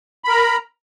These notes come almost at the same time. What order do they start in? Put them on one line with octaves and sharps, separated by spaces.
B5 A#4 A#5